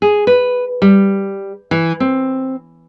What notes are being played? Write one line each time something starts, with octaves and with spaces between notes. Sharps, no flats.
G#4
B4
G3
E3
C4